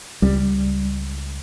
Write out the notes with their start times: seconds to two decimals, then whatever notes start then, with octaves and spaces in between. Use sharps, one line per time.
0.22 C#2 G3